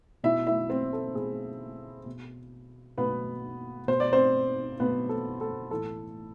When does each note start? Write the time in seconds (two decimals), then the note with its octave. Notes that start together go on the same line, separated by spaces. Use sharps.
0.24 B2 E4 E5
0.47 E4 E5
0.70 C4 C5
0.93 A4
1.15 B2 G#4
2.06 B2
2.98 B2 B3 B4
3.88 B2 C5
4.00 D5
4.12 C4 C5
4.80 B2 B3 B4
5.09 A4
5.41 A4
5.71 A2 E3 A4